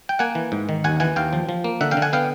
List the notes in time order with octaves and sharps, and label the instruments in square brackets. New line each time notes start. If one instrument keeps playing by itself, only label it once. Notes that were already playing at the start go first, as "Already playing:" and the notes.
[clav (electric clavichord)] G5
A#3 F#5 G#5
E3
G#2
D#3
D#2 F#5 G#5
E3 F#5 G#5
D#2 F5 G5
F3
F3
A#3
D3 E5 F#5
F5 G5
D3
F#5 G#5
B3 F5 G5